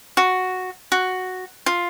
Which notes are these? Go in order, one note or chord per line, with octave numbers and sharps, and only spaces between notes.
F#4
F#4
F4